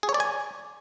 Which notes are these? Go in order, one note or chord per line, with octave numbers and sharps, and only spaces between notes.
G#4
C#5
D5
G#5